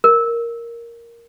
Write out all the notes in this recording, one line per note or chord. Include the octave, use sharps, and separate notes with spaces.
A#4